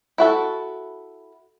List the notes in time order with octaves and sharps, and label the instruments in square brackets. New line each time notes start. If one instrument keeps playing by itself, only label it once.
[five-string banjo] E4 F#4 A4